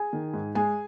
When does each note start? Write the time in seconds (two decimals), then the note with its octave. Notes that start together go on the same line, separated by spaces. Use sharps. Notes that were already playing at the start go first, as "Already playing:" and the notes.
Already playing: G#4 G#5
0.13 D#3
0.33 G#2
0.55 G#3 G#4 G#5